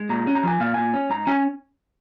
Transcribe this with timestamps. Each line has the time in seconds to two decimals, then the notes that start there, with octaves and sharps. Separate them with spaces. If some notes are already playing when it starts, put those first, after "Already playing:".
Already playing: G#3
0.09 A#2 A#5
0.27 C#4
0.35 A#5
0.43 F3 G#5
0.60 A#2 F5
0.74 A#2 G#5
0.94 C#4
1.10 G#2 A#5
1.27 C#4 G#5